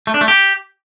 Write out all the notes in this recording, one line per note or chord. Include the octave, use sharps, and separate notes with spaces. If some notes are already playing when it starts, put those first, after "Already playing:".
A3
D4
A3
G4